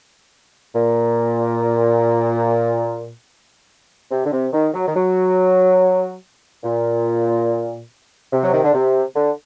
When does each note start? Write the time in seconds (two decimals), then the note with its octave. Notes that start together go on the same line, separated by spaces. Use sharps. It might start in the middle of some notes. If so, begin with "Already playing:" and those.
0.74 A#2
4.11 C3
4.25 D3
4.32 C3
4.53 D#3
4.74 F#3
4.87 D#3
4.95 F#3
6.63 A#2
8.32 C3
8.42 F#3
8.53 D#3
8.64 D3
8.74 C3
9.15 D3